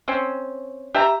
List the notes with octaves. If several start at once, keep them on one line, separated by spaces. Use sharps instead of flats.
C4 C#4
G4 E5 A5 A#5